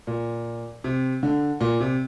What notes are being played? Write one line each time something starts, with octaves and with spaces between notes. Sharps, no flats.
A#2
C3
D3
A#2
C3